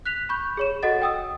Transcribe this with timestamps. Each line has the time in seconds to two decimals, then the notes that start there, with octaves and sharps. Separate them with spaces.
0.06 F#6 B6 F7
0.29 B5 C#6 G6
0.57 G#4 C#5 E7
0.83 F#4 A4 D#5 F#5 A6
1.02 G5 D#6 E6